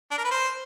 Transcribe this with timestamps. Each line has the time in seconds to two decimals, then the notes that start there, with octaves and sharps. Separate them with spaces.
0.11 D4
0.18 A#4
0.24 B4
0.31 C5